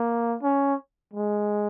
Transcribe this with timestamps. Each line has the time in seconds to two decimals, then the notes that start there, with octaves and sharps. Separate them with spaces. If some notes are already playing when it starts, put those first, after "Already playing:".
Already playing: A#3
0.43 C#4
1.14 G#3